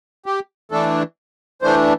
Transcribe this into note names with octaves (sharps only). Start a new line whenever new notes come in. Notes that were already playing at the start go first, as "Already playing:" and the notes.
G4
E3 A3 D4 A4
E3 A3 D4 C5